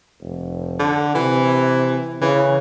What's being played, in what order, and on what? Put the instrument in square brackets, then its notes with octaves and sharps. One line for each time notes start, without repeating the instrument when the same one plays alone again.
[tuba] F1
[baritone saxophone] D3
[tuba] C3 [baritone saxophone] E3
[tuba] C#3 [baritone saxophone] E3